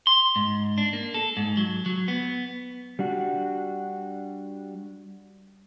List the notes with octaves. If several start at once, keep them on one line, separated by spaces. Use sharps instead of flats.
C6
G#2
D4
A#3
A4
G#2
F#3
F#3
B3
G3 D4 F#4